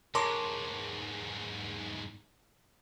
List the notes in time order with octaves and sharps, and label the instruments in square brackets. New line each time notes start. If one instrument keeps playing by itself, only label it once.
[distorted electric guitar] E2 G#2 [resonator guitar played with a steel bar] A#4 C#5 [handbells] A5 C6 D6